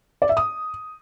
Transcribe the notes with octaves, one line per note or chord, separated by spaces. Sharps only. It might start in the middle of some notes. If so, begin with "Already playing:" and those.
D5
E5
D#6